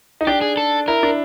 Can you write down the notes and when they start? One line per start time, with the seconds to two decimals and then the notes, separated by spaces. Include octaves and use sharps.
0.21 D#4
0.27 D4 G4
0.41 G#4
0.57 A4
0.88 E4 A#4
1.03 D4